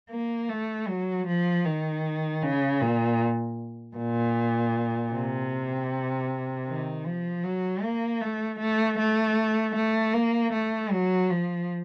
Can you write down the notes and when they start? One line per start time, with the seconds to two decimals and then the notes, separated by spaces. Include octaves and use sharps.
0.10 A#3
0.49 A3
0.88 F#3
1.27 F3
1.65 D#3
2.42 C#3
2.81 A#2
3.97 A#2
5.12 C3
6.67 D#3
7.05 F3
7.44 F#3
7.82 A#3
8.21 A3
8.59 A3
8.98 A3
9.75 A3
10.14 A#3
10.53 A3
10.91 F#3
11.30 F3